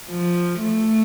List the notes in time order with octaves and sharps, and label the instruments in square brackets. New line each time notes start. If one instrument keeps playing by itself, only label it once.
[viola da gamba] F3
A3